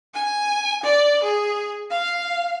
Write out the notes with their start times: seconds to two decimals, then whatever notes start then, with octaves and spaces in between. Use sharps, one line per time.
0.14 G#5
0.83 D5
1.23 G#4
1.90 F5